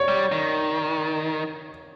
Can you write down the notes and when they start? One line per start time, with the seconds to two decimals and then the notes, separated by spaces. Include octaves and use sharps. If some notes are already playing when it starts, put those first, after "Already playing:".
Already playing: C#5 D5
0.08 G3
0.32 D#3